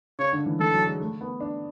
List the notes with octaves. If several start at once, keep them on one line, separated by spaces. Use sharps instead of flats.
C#3 C#5
D3
E3
E3 A4
F#3
G#3
A3
B3
D4